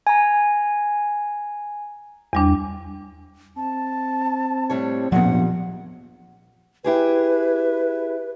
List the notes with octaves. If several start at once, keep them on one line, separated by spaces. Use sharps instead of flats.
G#5 A#5
E2 G3 D4
C4 A5
A2 G3 C#5
A#1 A#2 F3 G3 B3 C4 F#5
E4 G4 G#4 B4